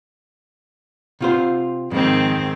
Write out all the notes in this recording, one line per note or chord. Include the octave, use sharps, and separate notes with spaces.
C3 F4 C5
F2 G#2 D#3 C4